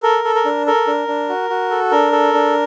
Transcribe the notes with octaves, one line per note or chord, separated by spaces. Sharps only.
A4 A#4
A4
A#4
D4
A4 A#4
D4
D4
F#4
F#4
A4
D4 A#4
A4
D4